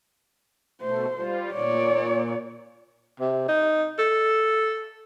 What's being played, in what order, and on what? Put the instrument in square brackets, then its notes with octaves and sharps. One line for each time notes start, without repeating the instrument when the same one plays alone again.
[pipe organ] B2 A3 [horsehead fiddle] C5
[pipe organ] G3 F4
[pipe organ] A#2 [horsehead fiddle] C#5 D5
[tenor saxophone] C3
D#4
A4